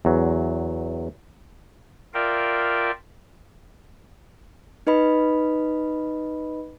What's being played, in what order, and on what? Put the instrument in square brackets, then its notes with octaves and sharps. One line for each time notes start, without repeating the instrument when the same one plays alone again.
[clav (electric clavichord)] E2 F#3
[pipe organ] F4 A#4 D5 E5 F5 G5
[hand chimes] D#4 B4 D#5 B5